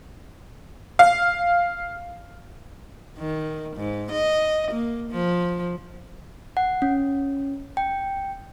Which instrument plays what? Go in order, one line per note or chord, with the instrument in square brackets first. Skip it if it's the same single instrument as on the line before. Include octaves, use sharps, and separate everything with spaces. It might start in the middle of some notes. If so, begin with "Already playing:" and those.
[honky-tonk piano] F5
[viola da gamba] D#3
G#2
D#5
A#3
F3
[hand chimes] F#5
C#4
G5